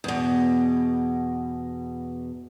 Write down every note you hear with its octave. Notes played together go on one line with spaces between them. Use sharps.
E2 B2